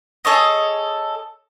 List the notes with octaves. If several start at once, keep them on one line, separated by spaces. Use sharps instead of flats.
G#4 A4 C#5 D#5